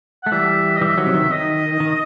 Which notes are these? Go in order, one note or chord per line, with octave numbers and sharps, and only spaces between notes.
A3 F#5
E3 G3 E5
D#5
E3 G3 E5
D#3 F#3
C3
D#3
D#3 D#5
D#3